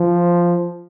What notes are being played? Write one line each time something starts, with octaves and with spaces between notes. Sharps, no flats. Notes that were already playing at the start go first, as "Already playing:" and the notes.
Already playing: F3